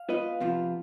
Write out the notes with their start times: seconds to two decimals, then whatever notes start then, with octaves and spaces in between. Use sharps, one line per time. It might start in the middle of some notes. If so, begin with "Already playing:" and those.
Already playing: F5
0.09 B3 F4 B4 D#5
0.40 F2 C3 F3 B3 F4